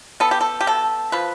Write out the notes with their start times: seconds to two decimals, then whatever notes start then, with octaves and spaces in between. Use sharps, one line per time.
0.20 B3 A4
0.31 G4
0.41 A4
0.61 G4
0.67 B2 A4
1.12 F3 B4